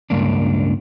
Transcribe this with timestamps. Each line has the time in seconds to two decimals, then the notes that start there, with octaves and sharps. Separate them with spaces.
0.10 C#2 G2 A#3 D4